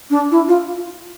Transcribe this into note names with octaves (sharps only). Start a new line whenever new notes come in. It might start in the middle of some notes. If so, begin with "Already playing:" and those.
D4
E4
F4